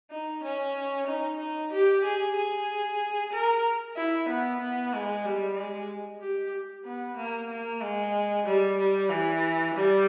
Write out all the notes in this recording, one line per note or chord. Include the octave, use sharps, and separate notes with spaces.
D#4
C#4
D#4
D#4
G4
G#4
G#4
A#4
E4
B3
B3
G#3
G3
G#3
G4
B3
A#3
A#3
G#3
G3
G3
E3
G3